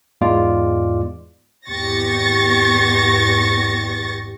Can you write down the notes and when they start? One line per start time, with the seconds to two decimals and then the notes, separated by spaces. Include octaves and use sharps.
0.21 E2 G#2 G#3 F4 D5 D6
1.68 G#1 E2 G4 C#6 A6 A#6